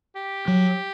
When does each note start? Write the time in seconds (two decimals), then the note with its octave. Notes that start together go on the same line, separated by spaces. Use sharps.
0.15 G4
0.48 F#3